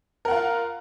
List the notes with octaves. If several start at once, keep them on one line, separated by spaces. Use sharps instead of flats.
F4 A#4 F#5